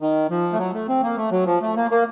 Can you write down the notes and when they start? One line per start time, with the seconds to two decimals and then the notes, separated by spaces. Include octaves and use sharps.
0.01 D#3
0.30 F3
0.53 A3
0.58 F#3
0.74 A3
0.88 C4
1.03 A#3
1.17 A3
1.31 F#3
1.46 F3
1.62 A3
1.76 A#3
1.91 A#3